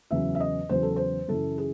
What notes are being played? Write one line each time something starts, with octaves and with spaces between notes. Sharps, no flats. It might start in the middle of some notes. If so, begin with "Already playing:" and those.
E2 C#3 F#3 E5
E5
D#5
E2 C#3 F#3 C5
A4
C5
F#2 C#3 E3 A4
G#4